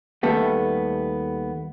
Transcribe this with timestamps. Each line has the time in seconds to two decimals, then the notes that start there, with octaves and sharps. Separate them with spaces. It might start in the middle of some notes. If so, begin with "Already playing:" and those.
0.23 D#2 G3 A3 B3